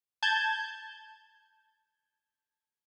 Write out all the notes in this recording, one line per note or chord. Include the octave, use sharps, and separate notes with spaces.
A5 G6 G#6